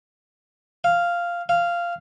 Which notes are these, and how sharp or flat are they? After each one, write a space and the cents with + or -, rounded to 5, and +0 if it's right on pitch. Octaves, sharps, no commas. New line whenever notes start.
F5 -5
F5 -10